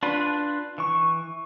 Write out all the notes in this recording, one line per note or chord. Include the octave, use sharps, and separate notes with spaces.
D4 F4 B4
E3 C#6